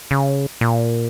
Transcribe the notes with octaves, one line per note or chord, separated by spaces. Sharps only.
C#3
A#2